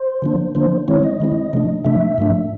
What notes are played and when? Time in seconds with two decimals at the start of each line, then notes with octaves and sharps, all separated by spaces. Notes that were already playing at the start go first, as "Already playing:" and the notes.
Already playing: C5
0.22 D3 F3 A#3 D4
0.55 D3 F3 A#3 D4 C5
0.88 D#3 G#3 C4 E4 C#5
1.03 D#5
1.20 D#3 G#3 C4 E4
1.53 C3 F3 A3 D4
1.84 C3 F3 A3 D4 E5
2.18 G#2 F3 A3 D4